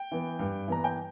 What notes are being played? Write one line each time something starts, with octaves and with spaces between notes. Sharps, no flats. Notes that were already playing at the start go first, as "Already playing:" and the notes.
Already playing: G5
E3 B3
G2
E3 B3 A#5
G5